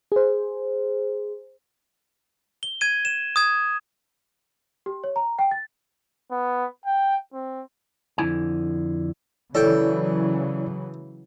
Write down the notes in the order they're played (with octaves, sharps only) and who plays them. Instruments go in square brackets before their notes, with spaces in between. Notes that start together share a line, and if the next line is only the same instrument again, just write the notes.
[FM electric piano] G#4 C5
[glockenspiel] G7
G#6 D#7
E7
D#6 G#6
[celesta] G4
C#5
A#5
G5
A6
[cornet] B3
G5
C4
[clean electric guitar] F2 D3 E4 G#5
[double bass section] C#3 E3 F#3 [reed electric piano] E4 C#5 D5 [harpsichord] A4 G5